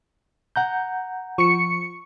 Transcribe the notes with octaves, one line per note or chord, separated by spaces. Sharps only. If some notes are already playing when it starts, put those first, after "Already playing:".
F#5 A#5 G6
F3 C#6 C#7